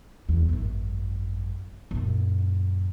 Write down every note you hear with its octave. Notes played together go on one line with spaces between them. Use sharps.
E2
G#1 F#2
F#2 A#2